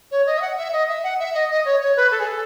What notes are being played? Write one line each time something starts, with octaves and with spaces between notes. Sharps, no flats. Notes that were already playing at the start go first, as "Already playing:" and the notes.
C#5
D#5
E5
F#5
E5
D#5
E5
F#5
E5
D#5
D#5
C#5
C#5
B4
A4
G#4
A4